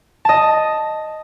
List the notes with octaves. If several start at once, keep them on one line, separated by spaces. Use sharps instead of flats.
D#5 A5